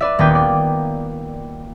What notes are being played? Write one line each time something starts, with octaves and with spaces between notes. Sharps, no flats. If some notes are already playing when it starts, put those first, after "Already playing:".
B4 D5 E5
D#1 A#3 B3 A#4 B4 G5
D5